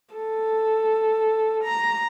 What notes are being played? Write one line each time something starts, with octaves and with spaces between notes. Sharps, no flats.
A4
A#5